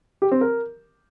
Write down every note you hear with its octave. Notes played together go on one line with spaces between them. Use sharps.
G4
C4
A#4